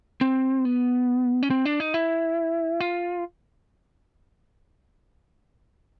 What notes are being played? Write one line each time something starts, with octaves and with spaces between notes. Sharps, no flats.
C4
B3
C#4
C4
D4
D#4
E4
F4